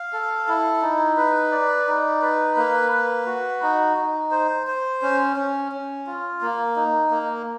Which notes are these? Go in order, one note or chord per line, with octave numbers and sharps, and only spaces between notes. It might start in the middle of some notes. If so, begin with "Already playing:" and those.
Already playing: F5
A4
E4
D#4
B4
D5
D#4
B4
A#3
B4
F#4
D#4
D#4
C5
C5
C#4
C#4
C#4
F4
A#3
D#4
A#3